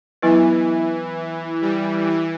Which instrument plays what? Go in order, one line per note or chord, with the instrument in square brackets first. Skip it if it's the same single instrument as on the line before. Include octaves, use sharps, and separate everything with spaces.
[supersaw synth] E3 [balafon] F#3 B3 E4 B4
[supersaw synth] G3
E3